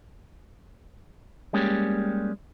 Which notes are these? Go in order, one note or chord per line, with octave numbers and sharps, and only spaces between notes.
G3 G#3 A#3 C#4 G4